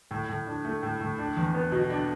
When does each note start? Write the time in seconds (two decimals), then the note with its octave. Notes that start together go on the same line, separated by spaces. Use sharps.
0.11 A2
0.29 A2
0.47 D4
0.65 A3
0.83 A2
1.01 A2
1.18 D4
1.37 E2
1.54 B3
1.72 B2
1.90 D4